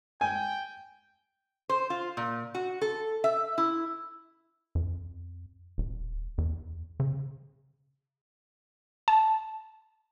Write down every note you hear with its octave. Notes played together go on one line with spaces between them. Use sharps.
G5 G#5
C5
F4
A#2
F#4
A4
E5
E4
F2
D#1
E2
C#3
A5